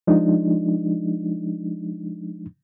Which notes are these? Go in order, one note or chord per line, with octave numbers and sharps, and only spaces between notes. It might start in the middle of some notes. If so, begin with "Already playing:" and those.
F3 G#3 D4 D#4